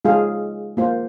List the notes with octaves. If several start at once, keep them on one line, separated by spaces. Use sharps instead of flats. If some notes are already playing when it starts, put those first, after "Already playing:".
G#3 F4 G#4 F5
A#3 F4 C5